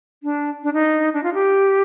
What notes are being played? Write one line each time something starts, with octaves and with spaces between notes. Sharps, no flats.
D4
D4
D#4
D4
F4
G4